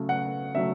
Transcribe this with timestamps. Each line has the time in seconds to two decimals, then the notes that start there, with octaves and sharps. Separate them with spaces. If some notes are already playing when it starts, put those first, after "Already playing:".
Already playing: C#3 F#3 A3
0.09 F#5
0.55 C#3 F#3 A3 E5